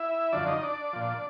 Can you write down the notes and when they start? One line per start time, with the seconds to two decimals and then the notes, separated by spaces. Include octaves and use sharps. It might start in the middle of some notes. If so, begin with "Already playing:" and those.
Already playing: E4 E5
0.32 F#2 D3 F3 D4 D5
0.47 D#4 D#5
0.63 D4 D5
0.93 A#2 F3